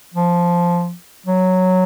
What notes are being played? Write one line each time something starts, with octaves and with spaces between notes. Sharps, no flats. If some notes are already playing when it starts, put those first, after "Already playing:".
F3
F#3